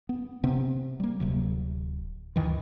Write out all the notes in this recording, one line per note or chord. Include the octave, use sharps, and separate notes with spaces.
B3
C3 B3 C4
G3 A#3
D1 C3 F#3
D2 G2 D#3 E3